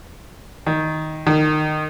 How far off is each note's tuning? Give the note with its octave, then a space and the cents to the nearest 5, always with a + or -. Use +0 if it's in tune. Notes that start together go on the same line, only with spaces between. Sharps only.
D#3 +5
D#3 -20